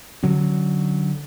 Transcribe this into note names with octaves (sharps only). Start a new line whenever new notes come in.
D3 F#3 C#4